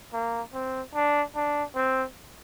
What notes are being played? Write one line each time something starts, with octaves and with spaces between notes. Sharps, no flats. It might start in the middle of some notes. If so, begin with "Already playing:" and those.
A#3
C4
D4
D4
C4